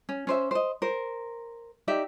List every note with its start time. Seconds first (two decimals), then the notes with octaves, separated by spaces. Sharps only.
0.09 C#4
0.27 C#4 C5 E5
0.51 C5 D#5
0.82 A#4 C5
1.88 D#4 G4 D5 E5